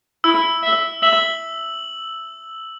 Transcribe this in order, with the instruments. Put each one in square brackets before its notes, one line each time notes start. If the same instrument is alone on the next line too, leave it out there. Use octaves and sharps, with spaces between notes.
[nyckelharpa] E4 [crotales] E6
[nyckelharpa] E5
[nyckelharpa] E5 [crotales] F#7